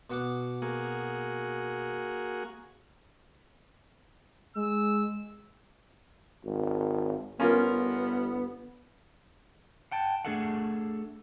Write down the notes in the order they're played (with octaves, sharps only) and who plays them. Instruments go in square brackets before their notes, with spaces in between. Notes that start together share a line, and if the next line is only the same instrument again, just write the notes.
[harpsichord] B2 F#5 D6
[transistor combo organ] A#3 F#4 G#4
[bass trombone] G#3 [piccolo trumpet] E6
[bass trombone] G#1
[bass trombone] G1 [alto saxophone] B3 [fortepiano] C#4 F4 A#4
[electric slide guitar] F#5 G5 A5
A3 D4 G#4 A4 E5 F#5